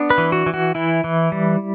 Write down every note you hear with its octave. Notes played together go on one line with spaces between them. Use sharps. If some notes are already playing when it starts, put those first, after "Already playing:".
Already playing: B3 D4
B4
E3
F#4
E3
F#4
E3 E4
E3
G3